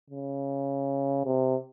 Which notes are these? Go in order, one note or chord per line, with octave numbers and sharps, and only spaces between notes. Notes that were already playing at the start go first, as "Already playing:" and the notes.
C#3
C3